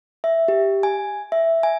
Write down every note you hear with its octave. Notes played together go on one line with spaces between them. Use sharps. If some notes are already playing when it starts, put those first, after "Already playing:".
E5
G4
G#5
E5
G#5